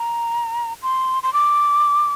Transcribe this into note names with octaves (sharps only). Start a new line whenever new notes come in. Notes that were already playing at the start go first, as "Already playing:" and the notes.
Already playing: A#5
C6
C6
D6